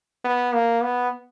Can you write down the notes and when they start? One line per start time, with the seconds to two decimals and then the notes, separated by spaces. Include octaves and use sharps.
0.24 B3
0.54 A#3
0.83 B3